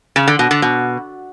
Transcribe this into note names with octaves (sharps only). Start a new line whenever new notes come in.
C#3
D3
B2
D3
B2